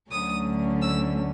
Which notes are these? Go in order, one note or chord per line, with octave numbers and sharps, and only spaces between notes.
D2 D3 F#3 A3 C#4 D#6
E6